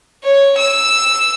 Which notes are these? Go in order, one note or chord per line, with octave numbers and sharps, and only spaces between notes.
C#5
E6